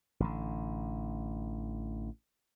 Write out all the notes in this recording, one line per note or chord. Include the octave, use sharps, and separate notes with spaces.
A1 D3